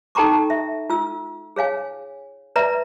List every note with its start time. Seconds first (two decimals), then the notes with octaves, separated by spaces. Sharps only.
0.15 D#4 A4 G5 A#5 C#6 D6
0.50 E5
0.90 F4 E6
1.56 G#4 C#5 F5 G#5
2.56 B4 D5 E5 A#5